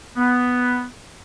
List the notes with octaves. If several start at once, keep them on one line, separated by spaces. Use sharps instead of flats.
B3